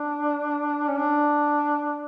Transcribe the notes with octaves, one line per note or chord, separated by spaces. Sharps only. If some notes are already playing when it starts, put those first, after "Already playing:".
Already playing: D4
C#4
D4